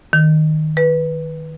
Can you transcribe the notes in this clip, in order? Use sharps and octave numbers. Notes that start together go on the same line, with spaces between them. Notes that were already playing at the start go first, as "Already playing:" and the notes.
D#3
B4